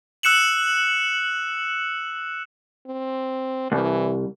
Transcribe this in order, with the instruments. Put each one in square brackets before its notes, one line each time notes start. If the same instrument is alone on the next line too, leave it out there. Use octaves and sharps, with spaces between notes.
[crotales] E6 F#6 C#7 E7 F#7
[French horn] C4
[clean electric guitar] C2 [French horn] E3